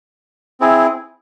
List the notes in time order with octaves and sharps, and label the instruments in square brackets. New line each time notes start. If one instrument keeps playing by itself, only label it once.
[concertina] C4 E4 G#4